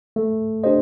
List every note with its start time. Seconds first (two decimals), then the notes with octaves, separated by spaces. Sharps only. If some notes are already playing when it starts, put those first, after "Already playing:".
0.16 A3
0.64 D4 G4 C5 D#5